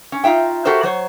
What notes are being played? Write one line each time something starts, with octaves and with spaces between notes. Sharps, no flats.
C#4
D#4 F4 E5 G5
F#4 G4 A4 A#4 C5 E5
F#3 C5 C#5